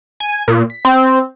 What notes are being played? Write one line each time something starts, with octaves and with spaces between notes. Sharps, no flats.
G#5
A#2
B6
C4